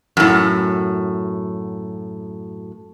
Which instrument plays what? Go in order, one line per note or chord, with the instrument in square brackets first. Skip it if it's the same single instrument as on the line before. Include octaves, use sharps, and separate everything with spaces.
[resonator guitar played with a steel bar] F#2 A2